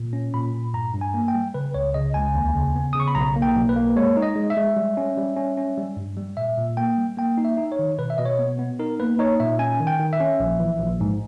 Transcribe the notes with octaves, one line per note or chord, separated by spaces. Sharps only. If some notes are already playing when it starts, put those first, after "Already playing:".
Already playing: A#2
C#4
A#2 B5
A#2
G2 A#5
G2
G#5
A#3
G5
G3
C#3 B4
C#2 C#5
C#3 D#5
C#2 G#5
D#2
C#3
B3
C#3 D#6
C#6
B5
B1 A#5
A#3
G5
B1
B4
A#3
G#3 C#5
D#4
D#5
G#3
E5
G#3
G3
C#4
G3
C#4
C#4
G3
G2
G3
A#2 E5
A#2
A#3 G5
G3
A#3 G5
D#4
E5
D#4
C#5
D#3
B2 B4
E5
B2 D#5
C#5
B3
B3
D#4 A#4
A#3 B4
D#4 C#5
A#2 E5
C#4 G#5
D#3
G5
D#3
E5
C#4
A#1
E3
A#1
G#2